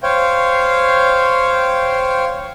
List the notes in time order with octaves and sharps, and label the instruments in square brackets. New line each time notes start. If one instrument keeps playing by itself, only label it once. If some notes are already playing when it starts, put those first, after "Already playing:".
[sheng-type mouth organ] C5 C#5 F5 G5